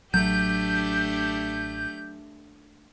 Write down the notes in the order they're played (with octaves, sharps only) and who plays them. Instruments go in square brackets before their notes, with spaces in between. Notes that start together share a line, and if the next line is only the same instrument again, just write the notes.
[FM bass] A1 [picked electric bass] F#3 [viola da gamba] A3 D4 G4 [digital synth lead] G6